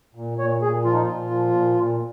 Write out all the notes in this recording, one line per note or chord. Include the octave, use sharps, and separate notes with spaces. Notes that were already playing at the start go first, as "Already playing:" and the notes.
A#2
A#2 C#5
A#2 G#4
F3 F4
D#4
F4
A#2
F3
A#2
A#2